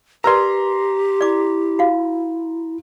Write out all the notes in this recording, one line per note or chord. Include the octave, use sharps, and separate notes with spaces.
G4 A#4 B4 D5 A#5 C6
E4 D5 D6
F#4 F5